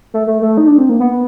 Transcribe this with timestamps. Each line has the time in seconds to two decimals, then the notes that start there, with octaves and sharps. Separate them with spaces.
0.14 A3
0.27 A3
0.42 A3
0.58 D#4
0.67 D4
0.78 C4
0.89 A#3
1.00 B3